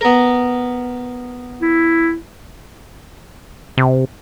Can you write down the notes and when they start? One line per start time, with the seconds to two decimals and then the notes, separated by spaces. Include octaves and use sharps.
0.01 B3 A#4
1.62 E4
3.78 C3